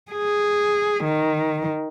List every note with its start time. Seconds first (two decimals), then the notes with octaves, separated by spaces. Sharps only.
0.11 G#4
1.05 D#3